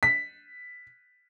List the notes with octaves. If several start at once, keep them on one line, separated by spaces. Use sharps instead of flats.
B6